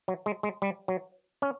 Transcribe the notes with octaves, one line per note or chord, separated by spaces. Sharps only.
F#3
G#3
G#3
G3
F#3
C#4